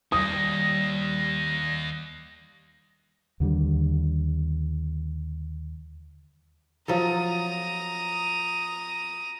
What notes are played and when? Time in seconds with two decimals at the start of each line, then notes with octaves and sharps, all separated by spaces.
0.12 D#2 G3 D#6 A#6
3.40 D#2 D3 F#3 G3
6.88 F3 F#3 A4 A#5 D#6